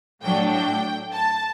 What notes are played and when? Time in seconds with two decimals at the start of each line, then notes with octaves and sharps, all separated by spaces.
0.22 A2 F#3 A3 D4 G5
0.52 G5
1.13 A5